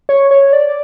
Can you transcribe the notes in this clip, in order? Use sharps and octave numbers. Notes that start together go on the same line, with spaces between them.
C#5
C#5
D5